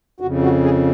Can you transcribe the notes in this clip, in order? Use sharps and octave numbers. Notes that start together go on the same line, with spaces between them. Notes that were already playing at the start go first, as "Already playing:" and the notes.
F2 C#3 F#4
F#4
G#4